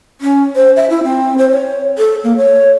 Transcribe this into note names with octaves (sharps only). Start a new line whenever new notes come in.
C#4
C5
E5
E4
C4
C5
C#5
A4
A#3
C#5